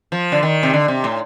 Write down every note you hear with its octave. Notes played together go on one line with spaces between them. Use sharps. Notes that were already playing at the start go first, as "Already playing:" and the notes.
F3
D3
D#3
C3
D3
C3
A2